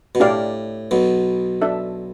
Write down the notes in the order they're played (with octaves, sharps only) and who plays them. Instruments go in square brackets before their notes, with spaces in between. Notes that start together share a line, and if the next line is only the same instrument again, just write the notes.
[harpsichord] B2
[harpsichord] A2 [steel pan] D4 G4 D5 F5
[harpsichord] B1 B2
[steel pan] D4 A4 E5